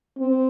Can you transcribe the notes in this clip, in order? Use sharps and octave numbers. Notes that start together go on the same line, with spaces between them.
C4